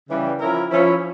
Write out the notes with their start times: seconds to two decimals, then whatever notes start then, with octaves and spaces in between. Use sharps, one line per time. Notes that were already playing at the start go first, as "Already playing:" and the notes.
0.08 C#3 E3 G3
0.40 F3 C#4 E4 A#4
0.70 F3 C#4 E4